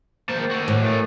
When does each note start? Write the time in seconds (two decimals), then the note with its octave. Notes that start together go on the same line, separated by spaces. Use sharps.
0.29 D#3 A#3 C5 A5
0.51 F#4 A4
0.68 A2
0.82 D#3 E3 A3 A4